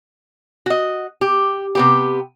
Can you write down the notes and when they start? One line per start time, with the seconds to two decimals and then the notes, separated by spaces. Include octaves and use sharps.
0.66 F#4 D#5
1.21 G4
1.75 C3 B3 G4